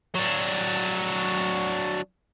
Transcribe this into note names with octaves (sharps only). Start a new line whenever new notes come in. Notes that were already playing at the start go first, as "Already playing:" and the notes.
F#3 D4